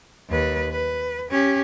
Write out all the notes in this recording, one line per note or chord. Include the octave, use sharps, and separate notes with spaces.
D#2 B4
B4
C#4 G4